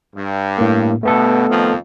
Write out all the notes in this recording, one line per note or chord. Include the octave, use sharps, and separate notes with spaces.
G2
A2 A#3
G2 B2 A3 B3 A4
F2 D#3 F3